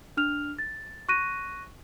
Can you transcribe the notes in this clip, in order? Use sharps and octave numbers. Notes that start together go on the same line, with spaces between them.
D4 F6 F7
A6
C#6 F#6 A#6 D#7